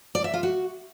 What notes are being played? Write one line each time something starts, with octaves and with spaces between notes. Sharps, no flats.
D5
E5
F4
F#4